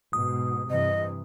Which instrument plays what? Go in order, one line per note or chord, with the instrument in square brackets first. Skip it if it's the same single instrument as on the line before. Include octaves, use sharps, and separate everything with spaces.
[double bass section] G#2 B2 [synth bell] D#6
[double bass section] G2 C3 E3 [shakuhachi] D#5